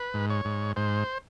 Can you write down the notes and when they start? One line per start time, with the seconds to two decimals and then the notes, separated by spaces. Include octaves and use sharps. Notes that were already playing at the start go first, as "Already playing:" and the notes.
Already playing: B4
0.14 G#2
0.30 C#5
0.45 G#2
0.76 G#2 C5